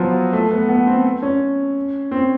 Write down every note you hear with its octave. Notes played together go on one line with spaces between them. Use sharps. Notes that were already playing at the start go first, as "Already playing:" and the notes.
Already playing: F3 F#3 B3
A3
B3
B3
C4
C#4
C4